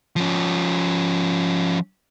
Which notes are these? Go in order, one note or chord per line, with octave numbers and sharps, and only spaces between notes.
F3 C#4